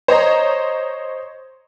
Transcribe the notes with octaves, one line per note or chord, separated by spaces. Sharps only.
C5 C#5 D#5 A#5